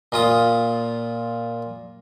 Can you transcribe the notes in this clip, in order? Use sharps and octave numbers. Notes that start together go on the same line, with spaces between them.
A#2 F4 D#6